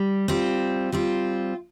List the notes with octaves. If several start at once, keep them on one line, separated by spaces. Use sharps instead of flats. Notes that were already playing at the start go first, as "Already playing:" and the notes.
Already playing: G3
G3 C4 F4
G3 C4 F4